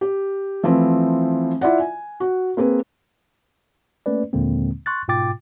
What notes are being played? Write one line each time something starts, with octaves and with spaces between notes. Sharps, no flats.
G4
E3 F3 A3 C4 E4
E4 F4 D5 F#5
G#5
F#4
A#3 C4 G#4 B4
A3 A#3 C#4 B4 D5
D#2 A#2 D3 G#3 A#3 C4
C6 C#6 F#6 A6
G#2 B2 F4 G5 D6 A6